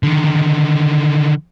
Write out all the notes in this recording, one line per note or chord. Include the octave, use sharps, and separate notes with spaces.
D3 D#3